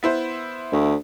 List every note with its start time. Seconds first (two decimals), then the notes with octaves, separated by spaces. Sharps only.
0.03 B3 E4 C5
0.72 D2